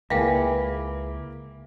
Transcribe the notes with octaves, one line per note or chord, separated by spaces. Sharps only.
C#2 A#3 E4 G#4 B4 E5 F5 G5